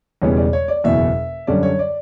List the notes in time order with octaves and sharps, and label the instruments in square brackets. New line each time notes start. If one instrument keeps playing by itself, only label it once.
[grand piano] E1 E2 C#3 G3 B3 C#5
D5
C#5
D5
F#1 E2 B2 E5
F#2 D3 G3 C#4 D5
C#5
D5